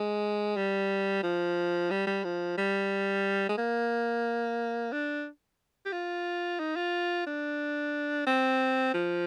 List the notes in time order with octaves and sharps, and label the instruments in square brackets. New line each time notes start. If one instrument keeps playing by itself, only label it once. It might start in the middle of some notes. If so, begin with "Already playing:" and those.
Already playing: [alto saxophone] G#3
G3
F3
G3
G3
F3
G3
G#3
A#3
D4
G4
F4
D#4
F4
D4
C4
F3